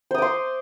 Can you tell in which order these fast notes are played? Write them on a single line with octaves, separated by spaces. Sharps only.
C5 D#6 D6 C6